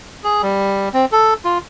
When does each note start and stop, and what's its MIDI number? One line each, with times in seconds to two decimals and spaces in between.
0.24 0.42 68
0.42 0.89 55
0.94 1.05 60
1.12 1.34 69
1.44 1.58 65